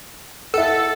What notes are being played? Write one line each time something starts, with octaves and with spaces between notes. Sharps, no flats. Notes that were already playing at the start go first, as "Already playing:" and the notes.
E4 A4 F#5